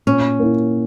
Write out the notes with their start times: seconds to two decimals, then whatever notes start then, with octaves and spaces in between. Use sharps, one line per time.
0.07 A#2 C#4
0.39 A#3 E4